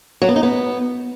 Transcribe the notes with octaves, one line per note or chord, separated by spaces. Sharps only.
F#3
B3
D#4
B3